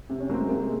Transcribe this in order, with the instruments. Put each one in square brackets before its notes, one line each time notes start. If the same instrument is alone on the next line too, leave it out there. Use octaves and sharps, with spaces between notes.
[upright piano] C3 [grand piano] C4
[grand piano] C#4
[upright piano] F#3 [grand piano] A#3
[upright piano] C4
[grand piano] G#3
[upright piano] C3 [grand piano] A#3
[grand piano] G#3